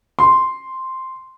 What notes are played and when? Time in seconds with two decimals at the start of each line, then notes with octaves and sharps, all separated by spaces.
0.19 C6